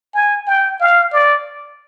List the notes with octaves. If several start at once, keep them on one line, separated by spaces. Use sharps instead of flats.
G#5
G5
F5
D5